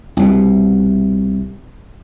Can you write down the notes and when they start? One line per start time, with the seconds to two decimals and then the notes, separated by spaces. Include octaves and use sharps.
0.17 C2 B2